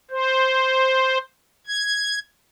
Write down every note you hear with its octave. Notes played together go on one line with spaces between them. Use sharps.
C5
G#6